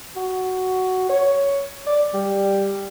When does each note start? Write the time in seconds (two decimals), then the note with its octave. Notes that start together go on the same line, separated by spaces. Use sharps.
0.16 F#4
1.09 C#5
1.87 D5
2.14 G3